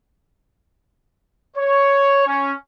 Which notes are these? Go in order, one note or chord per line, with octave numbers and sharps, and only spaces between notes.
C#5
C#4